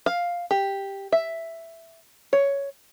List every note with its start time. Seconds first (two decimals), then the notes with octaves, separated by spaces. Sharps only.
0.06 F5
0.51 G4
1.12 E5
2.33 C#5